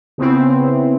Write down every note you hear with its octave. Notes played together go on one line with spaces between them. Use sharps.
C#3 B3 C4 E4